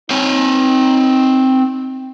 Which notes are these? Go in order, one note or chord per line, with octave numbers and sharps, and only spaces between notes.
C4 D#4 C#5